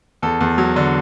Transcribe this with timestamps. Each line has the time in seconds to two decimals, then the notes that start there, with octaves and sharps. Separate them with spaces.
0.22 E2 A4
0.41 E2
0.58 F#3
0.76 D3